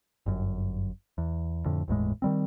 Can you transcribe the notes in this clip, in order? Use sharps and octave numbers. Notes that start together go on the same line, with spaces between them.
G1 F#2
E2
F2 A2 D3
G1 E2 A2 G#3
D#3 G3 C4